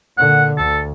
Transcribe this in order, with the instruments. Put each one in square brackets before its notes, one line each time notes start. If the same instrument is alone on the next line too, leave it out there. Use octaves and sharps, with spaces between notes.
[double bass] A#2 D3 [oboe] F#5
[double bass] D2 [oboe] A4